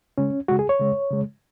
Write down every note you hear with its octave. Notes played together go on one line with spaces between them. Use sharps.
C#3 G#3 C#4
C#3 G#3 F#4
G#4
C#5
C#3 G#3
C#3 G#3